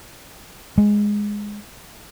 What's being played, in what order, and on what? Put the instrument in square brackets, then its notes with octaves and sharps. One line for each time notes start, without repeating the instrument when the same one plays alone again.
[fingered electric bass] G#3